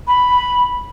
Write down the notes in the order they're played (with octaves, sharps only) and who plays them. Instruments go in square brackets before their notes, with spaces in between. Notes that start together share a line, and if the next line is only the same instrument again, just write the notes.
[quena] B5